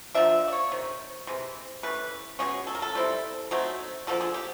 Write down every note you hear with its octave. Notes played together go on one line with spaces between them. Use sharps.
D3 F3 A#3 D4 E5
D5
C#5
C3 D#3
C3 E3 G#3
E3 A3 C#4 B4
B2 G#3 C#4 G#4
A4
A#4
A4
G3 C4 E4
F#3 A3 C4 D#4
D3 F3 A#3 A4
G#4
G4